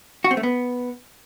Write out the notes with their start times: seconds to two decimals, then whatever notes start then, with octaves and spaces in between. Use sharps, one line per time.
0.24 F#4
0.31 C4
0.37 A3
0.43 B3